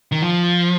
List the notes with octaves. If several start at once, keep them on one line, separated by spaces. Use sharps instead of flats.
D#3
F3